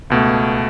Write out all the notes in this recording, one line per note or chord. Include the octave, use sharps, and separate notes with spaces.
C#2 B2 A3